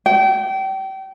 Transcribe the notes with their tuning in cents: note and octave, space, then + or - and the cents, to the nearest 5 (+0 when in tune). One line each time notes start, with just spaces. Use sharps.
G5 -30